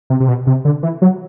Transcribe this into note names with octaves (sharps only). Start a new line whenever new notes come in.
C3
C3
B2
C3
D3
E3
F#3